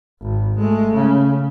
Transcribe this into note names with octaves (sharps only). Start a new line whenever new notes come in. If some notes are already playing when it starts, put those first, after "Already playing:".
G#1
G#3 A3
C#3